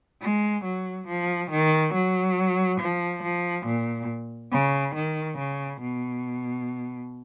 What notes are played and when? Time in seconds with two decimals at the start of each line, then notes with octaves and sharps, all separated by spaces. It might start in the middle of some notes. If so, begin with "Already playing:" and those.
0.22 G#3
0.64 F#3
1.08 F3
1.50 D#3
1.94 F#3
2.80 F3
3.23 F3
3.66 A#2
4.52 C#3
4.95 D#3
5.38 C#3
5.81 B2